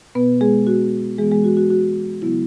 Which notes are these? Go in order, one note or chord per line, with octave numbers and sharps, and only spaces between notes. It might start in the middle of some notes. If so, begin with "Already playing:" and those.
B2 B3 B4
G#3 G#4
F#4
E3 G#3 B3 G#4
G#3 G#4
F#4
F#4
F#4
C#3 F#3 B3 E4